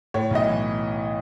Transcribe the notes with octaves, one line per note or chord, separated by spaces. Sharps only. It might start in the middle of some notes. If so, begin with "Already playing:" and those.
A2 C#5
B1 D#5
E3